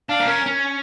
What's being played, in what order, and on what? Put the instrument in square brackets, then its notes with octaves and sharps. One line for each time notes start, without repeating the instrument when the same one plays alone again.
[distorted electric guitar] D4 [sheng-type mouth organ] F5
[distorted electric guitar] A#3
[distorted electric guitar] C#4 [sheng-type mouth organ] A#4
[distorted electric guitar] C#4